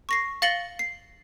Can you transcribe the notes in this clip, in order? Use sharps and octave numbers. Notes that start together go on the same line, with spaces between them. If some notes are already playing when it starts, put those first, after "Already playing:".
C#6 A#6 C7
F5 A6 A#6 C#7 F#7 G7
C7